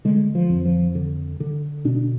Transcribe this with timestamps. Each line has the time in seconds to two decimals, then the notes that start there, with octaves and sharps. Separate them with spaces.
0.05 D3 G#3
0.35 F3
0.50 F2
0.65 F3
0.95 D3
1.40 D3
1.85 B2 D4